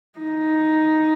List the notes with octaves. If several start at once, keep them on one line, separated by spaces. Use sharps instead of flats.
D#4